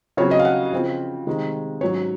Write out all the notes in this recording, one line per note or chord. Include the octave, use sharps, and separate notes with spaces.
C#3 F#3 C4 C#5
D#5
F5
F#5
C#3 F3 C4
C3 D#3 G#3
G#2 F#3 C#4 C#5